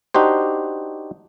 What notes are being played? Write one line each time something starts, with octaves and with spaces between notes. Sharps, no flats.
D4 D#4 F#4 G4 C5